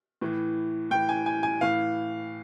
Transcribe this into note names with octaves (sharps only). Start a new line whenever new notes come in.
A2 E3
A2 E3 G5
G#5
G#5
G#5
A2 E3 F5